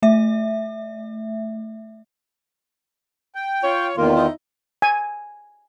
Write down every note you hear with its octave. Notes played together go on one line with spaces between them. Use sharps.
A3 E5
G5
F4 C#5
E2 C3 D#3 A3 A#3 F4
D#4 E4
G#5